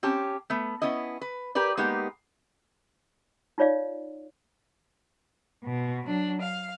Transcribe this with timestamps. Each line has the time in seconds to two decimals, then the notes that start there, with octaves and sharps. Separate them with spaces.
0.03 C4 C#4 G4 A5
0.50 A3 B3
0.82 B3 C#4 E4 D#5
1.21 B4
1.55 G4 A#4 B4 D5
1.77 G#3 A#3 B3 D#4 G4
3.58 D#4 F4 C#5 D5 F5
5.63 B2
6.07 F#3 D4
6.42 F5